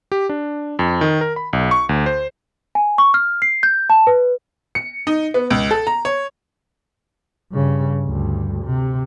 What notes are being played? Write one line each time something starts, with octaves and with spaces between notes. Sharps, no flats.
G4
D4
F2
D#3
A#4
B5
B1
C#6
D2
C5
G#5
C#6
F6
C7
G6
A5
B4
C#7
D#4
B3
C#2
A4
A#5
C#5
G2 C#3
D2 G2
C3